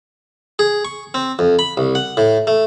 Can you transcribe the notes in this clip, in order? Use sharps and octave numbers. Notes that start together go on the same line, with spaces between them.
G#4
C#6
C4
F2
B5
C2
F#5
A2
A3